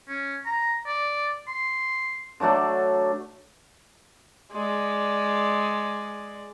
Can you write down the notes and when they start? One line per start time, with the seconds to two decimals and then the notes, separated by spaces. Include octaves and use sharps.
0.08 C#4
0.46 A#5
0.87 D5
1.47 C6
2.40 D3 F#3 A3 D4
4.52 G#3 D5